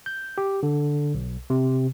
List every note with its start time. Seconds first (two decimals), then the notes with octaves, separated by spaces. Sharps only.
0.06 G6
0.38 G4
0.63 D3
1.14 B1
1.50 C3